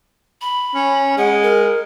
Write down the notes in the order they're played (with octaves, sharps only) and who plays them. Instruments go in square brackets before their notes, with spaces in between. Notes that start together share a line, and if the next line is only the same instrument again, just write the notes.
[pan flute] B5
[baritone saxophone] C#4
[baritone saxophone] G#3 [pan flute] F#5
[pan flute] A#4